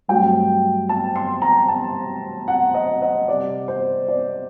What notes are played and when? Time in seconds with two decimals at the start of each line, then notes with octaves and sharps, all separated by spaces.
0.08 G2 F#3 A3 C4 G5
0.89 A5
1.16 C6
1.42 A#5
1.68 A5
2.48 F#5
2.74 D#5
3.02 D#5
3.28 C3 G3 C4 D5
3.68 C5
4.08 D5